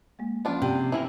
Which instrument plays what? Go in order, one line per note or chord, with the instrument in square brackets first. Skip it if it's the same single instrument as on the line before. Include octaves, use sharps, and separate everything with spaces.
[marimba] G#3 A#3
[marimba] F3 C#4 [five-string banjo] B3 D4 F4
[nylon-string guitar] C3
[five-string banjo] E3 E4 A#4